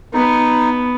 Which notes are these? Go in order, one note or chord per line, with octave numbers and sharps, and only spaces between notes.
B3 D#4